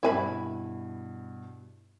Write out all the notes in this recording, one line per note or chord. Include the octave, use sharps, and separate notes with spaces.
G2 B2 E4 G#5 B5